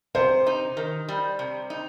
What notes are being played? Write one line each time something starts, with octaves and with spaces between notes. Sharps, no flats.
C3 C5
D#4
D#3
G3
C3
D#4